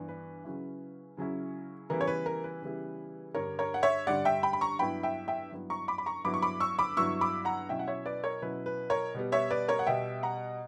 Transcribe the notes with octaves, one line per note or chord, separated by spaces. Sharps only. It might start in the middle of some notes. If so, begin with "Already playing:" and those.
Already playing: G2 E3 B3 D4
B4
C#3 F#3 C#4 E4
C#3 F#3 C#4 E4
C#3 E3 G3 B3 E4 A#4
C#5
B4
A#4
B4
C#3 E3 G3 B3 E4
G2 D3 G3 A#4 C#5
A#4 C#5
F#5
C#5 E5
G2 D3 G3 D5 F#5
E5 G5
G5 B5
B5
A#5 C#6
G2 F#3 B3 E4 G5 B5
E5 G5
E5 G5
G2 F#3 B3 E4
A#5 C#6
B5 D6
B5
A#5 C#6
G2 F#3 B3 E4 B5 D6
C#6
B5 D6
C#6 E6
B5 D6
G2 F#3 B3 E4 C#6 E6
B5 D6
F#5 A#5
B2 F#3 C#4 E4 E5 G5
F#5
C#5 E5
B4 D5
A#4 C#5
B2 F#3 C#4 E4 B4
B4
A#4 C#5
B2 G3 B3
C#5 E5
B4 D5
A#4 C#5
F#5
B2 G3 B3 E5 G5
F#5 A#5